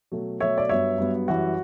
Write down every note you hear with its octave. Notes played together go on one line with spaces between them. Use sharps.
B2 F#3 A3
B2 F#3 A3 C#5 E5
D5
G2 F#3 B3 C#5 E5
G2 F#3 B3
F#2 E3 G3 F#4